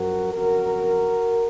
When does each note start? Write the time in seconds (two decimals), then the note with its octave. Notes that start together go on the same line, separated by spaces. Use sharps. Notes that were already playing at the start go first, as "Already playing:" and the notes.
Already playing: F#2 F3 F#4 A#4
0.33 F2 C#3 F#3 F#4 A#4